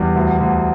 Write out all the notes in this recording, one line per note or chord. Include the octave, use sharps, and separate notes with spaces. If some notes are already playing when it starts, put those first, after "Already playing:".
Already playing: E2 G3
D2
D2